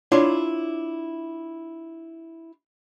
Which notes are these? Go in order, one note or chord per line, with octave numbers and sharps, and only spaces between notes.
D4 E4 F4 C#5 E5